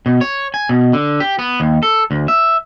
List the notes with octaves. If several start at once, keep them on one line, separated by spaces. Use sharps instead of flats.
B2
C#5
G#5
B2
D3
G4
B3
D#2
A4
D2
E5